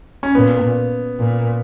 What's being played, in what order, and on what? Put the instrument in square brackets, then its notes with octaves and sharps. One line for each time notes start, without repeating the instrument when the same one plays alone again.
[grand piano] C#4
[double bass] A#2 [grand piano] B3
[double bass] A#2